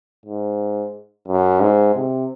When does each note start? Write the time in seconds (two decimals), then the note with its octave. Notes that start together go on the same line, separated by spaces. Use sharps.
0.26 G#2
1.28 F#2
1.61 G#2
1.95 C3